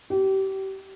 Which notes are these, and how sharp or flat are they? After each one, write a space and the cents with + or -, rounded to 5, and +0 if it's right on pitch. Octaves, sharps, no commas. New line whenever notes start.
G4 -30